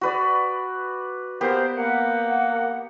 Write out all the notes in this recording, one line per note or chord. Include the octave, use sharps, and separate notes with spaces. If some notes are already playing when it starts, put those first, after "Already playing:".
F#4 B4 D5
A#3 B3 G4 A#4 C5
A#3 F#5